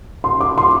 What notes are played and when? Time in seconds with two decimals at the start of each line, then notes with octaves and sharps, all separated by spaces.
0.24 C6
0.41 D6
0.58 C6